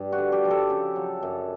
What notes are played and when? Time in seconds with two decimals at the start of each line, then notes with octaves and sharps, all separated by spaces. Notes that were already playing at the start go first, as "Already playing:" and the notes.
Already playing: G2
0.12 F#4
0.18 D3
0.32 G4
0.45 F3
0.51 A4
0.70 C#3
0.96 F#3
1.22 F#2